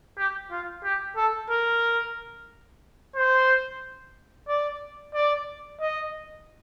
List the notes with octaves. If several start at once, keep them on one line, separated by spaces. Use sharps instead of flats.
G4
F4
G4
A4
A#4
C5
D5
D5
D#5